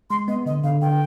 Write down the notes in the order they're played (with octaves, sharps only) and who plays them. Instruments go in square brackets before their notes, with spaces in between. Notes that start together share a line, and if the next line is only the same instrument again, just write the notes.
[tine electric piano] G#3 [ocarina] C6
[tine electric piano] B3 [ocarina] D#5
[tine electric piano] D3 [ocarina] D#5
[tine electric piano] D3 [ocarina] F5
[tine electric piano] D3 [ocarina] G5